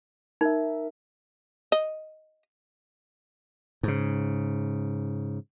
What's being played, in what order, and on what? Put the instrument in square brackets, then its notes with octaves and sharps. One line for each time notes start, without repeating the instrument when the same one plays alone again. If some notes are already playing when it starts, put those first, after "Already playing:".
[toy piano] D#4 [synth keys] A#4 E5
[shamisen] D#5
[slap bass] G#2 C#3